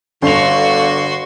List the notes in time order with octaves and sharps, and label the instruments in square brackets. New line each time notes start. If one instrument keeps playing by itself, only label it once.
[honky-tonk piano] G1 F7 [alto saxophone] D3 [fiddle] F#4 C6 [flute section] F5 C#6